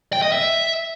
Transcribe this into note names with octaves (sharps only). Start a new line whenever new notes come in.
G5
D#5
E5